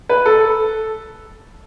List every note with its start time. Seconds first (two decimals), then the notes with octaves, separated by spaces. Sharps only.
0.09 B4
0.26 A4